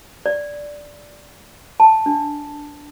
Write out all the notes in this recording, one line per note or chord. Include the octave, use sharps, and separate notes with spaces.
D5
A5
D4